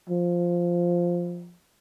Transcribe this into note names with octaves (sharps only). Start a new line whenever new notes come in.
F3